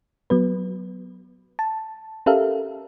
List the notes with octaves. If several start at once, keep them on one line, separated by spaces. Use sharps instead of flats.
F#3 B3 B4
A5
C#4 G4 A4 A#4 E5 F5